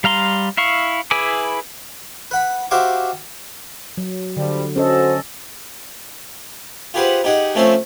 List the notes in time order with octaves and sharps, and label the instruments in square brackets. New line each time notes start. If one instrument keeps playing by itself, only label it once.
[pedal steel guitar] G3 F5 A#5 C6
E4 F5 C#6
E4 G#4 B4 G#5 D6
[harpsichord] B4 F#5 B5
F#4 G4 C5 E5 F5 D6
[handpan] F#3
[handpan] D3 [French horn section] F3 G3
[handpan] C#4 A4 D#5 [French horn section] F#4 C5
[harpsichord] F4 G4 G#4 B4 C5 F#5
D#4 G4 G#4 F#5
F3 A3 C4 C#4 A4 C5